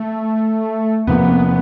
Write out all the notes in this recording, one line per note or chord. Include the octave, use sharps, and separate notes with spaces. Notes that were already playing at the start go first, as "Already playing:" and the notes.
Already playing: A3
E2 C3 F3 A#3 B3